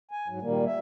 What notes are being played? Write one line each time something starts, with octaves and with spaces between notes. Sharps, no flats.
G#5
G#2 F#3
A#2 D#3 G3 A#3
E5